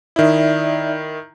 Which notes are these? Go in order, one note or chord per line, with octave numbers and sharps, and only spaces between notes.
D#3 D#4 E4 D5 E5